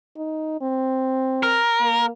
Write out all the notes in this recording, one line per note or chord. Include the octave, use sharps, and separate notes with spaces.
D#4
C4
A#4
A#3